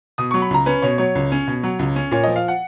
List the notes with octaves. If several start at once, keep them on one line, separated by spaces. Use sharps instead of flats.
B2 D#6
F#3 C#6
B5
C#2 A#5
C#4 B4
B2 C#5
F#3 C#5
C#2
C#4
B2
F#3
C#2
C#4
A#2 C#5
F3 D#5
F5
F#5